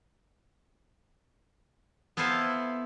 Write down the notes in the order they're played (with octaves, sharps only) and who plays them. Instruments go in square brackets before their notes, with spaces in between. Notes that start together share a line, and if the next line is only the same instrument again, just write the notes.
[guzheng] B3 E4 A4 C5 F5 G#5